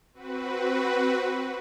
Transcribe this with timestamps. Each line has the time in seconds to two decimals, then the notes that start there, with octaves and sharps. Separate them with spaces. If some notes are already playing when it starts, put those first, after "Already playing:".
0.13 C4 F#4 B4